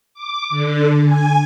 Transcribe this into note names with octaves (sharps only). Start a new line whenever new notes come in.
D6
D3
G#5